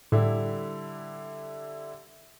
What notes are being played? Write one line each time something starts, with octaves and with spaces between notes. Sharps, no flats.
A2 D3 G3 E4